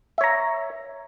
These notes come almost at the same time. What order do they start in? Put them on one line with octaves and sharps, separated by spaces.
E5 C#5 A#5